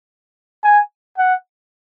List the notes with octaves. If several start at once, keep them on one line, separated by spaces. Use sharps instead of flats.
G#5
F#5